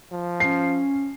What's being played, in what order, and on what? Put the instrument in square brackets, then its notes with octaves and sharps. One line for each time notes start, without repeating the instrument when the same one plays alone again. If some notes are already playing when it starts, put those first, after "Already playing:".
[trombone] F3
[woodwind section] C#4 [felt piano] C7